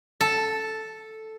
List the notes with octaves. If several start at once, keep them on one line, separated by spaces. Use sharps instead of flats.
A4